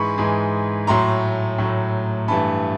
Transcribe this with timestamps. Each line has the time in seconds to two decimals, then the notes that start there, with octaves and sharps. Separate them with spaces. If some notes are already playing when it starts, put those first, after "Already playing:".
Already playing: G#2 E3 G#3 B5 C#6
0.18 G#2 E3 G#3
0.87 A2 F#3 A3 A#5 C6
1.58 A2 F#3 A3
2.28 G2 E3 A3 A5 B5